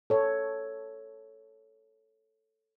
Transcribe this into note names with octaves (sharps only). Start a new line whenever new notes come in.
A4 C#5